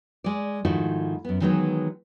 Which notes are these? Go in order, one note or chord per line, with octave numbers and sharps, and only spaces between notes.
G#3 D5
G#2 D#3 F3 A3 E4 F#4
F#2 B3
D#3 E3 F#3 G#3 B3 D#4